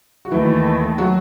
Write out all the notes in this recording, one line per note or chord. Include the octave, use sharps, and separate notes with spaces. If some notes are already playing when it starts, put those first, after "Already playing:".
F#4
D#2 D#3 E3 A3 E4
F#3 F#4